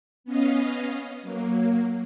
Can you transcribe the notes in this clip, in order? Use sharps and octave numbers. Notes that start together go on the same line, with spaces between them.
B3 C#4 D#5 F5
F#3 A#3